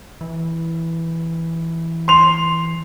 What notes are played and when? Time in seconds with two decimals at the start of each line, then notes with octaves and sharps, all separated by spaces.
0.21 E3
2.08 C6 F7